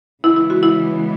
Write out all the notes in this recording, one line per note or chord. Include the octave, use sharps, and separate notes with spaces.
C#3 E3 G#3 B3 E4
E4
F#4
E4